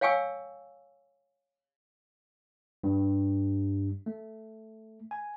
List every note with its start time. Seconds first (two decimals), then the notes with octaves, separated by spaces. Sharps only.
0.01 C#5 F5 G5 G#5 C#6 E6
2.83 G2
4.06 A3
5.11 G#5